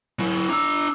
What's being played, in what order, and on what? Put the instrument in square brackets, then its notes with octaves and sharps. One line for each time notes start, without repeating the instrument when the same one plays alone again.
[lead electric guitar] F#3 E4
[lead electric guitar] D4 A#5 [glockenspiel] D6 E6